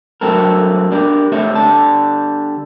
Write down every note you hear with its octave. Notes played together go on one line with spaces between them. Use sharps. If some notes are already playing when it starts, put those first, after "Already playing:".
G2 F#3 A3 C4 A4 A#4
D4 G4 A#4
A3 C4 G4 C#5 E5
D3 G3 A5